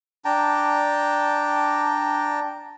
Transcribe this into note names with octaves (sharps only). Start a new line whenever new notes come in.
D4 G5 A5 A#5